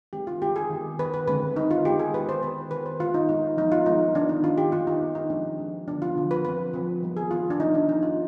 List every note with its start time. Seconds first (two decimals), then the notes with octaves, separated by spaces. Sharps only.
0.13 D#3 G#3 C4 G4
0.27 F4
0.42 D#3 G#3 C4 G4
0.56 G#4
0.71 D#3 B3
0.99 D#3 B3 B4
1.14 B4
1.28 D3 G#3 C4 B4
1.56 D3 G#3 C4 D#4
1.71 F4
1.85 D#3 G#3 B3 G4
1.99 G#4
2.14 D#3 G#3 B3 B4
2.29 C5
2.42 D#3 B3 B4
2.71 D#3 B3 B4
2.86 C5
3.00 D#3 G#3 B3 F4
3.14 D#4
3.29 D#3 G#3 B3 D#4
3.57 F3 G#3 B3 D#4
3.72 F4
3.86 F3 G#3 B3 D#4
4.15 D#3 G#3 B3 D4
4.29 D#4
4.43 D#3 G#3 B3 F4
4.58 G4
4.72 D#3 B3 F4
4.87 D#4
5.01 D#3 B3
5.15 D#4
5.30 F3 G#3 C4 D4
5.58 F3 G#3 C4
5.88 D3 F3 B3 D4
6.02 F4
6.16 D3 F3 B3
6.31 B4
6.44 F3 C4 B4
6.73 F3 C4
7.03 D#3 G3 B3
7.17 G#4
7.31 D#3 G3 B3 F4
7.50 D4
7.60 F3 B3 D#4
7.74 D4
7.89 F3 B3 D#4
8.03 F4